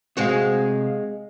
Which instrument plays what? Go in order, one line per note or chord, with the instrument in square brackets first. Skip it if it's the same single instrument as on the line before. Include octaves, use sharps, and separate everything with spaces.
[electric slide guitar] C3 F5 [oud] G#3 C4 F#4